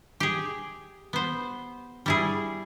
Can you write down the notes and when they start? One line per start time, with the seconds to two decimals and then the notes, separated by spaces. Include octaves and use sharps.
0.20 G4 G#4
1.13 B3 C5
2.06 G3 E4 G#4